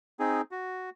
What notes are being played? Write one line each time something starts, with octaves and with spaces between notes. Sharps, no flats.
C4 D#4 G#4
F#4